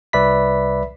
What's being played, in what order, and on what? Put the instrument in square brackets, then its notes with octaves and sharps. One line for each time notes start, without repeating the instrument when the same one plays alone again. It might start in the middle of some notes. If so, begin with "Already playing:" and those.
[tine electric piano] C2 B4 D5 E5 B5 B6